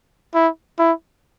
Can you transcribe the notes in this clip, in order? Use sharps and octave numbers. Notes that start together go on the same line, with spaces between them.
E4
E4